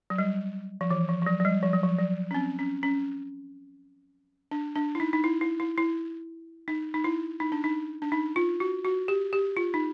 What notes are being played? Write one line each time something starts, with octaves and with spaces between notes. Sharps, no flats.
F#3
G3
F3
E3
F3
F3
F#3
F#3
G3
F3
F#3
F3
F#3
C#4
C4
C#4
C#4
D4
D4
E4
D#4
D#4
E4
E4
E4
E4
D#4
D#4
E4
D#4
D4
D#4
D4
D#4
F4
F#4
F#4
G4
G4
F4
D#4